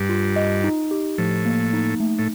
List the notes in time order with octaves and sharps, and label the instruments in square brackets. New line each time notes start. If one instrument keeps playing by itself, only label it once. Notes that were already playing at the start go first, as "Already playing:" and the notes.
Already playing: [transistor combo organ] G2
[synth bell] F4
D#5
D#4
G4
[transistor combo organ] A2 [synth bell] F3
[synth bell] A#3
D#4
A3
[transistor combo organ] A2